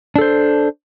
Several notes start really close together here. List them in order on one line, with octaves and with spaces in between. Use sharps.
D4 A4 C5